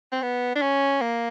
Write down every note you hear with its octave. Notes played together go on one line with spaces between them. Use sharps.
C4
B3
D4
C#4
A#3